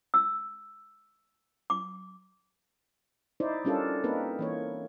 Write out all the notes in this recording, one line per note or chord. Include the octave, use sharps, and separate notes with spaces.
E6
D6
D#4 E4 C5 D5
G3 C#4 D4 F4 A4 A#4
A#3 C4 D#4 A#4 B4
E3 A#3 C#5